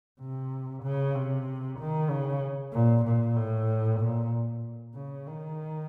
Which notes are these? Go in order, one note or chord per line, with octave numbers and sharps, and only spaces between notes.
C3
C#3
C3
D#3
C#3
A#2
A#2
A2
A#2
C#3
D#3